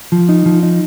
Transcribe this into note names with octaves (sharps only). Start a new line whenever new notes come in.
F3
D#4
F3
D#4